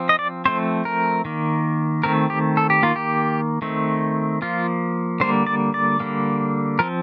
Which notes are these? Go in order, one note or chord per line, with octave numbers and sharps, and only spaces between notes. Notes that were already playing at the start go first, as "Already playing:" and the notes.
Already playing: F3 C4
D#5
D5
F3 A3 C4 C5
A#4
D#3 A#3
D#3 A3 C4 A#4
G4
A4
G4
D#3 A#3 F4
G4
D#3 A3 C4
F3 A#3 F4
D3 G3 A#3 C5
D5
D5
D3 G3 A#3
F3 C4 A#4